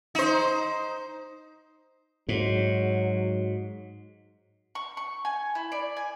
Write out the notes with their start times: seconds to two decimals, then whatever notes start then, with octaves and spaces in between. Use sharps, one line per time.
0.15 D#4 C5
2.29 G#2 F#3
4.75 C#6
4.97 C#6
5.25 G#5
5.55 E4
5.72 D5
5.97 G#5